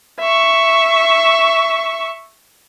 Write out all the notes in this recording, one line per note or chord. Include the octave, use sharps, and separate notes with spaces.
E5 C#6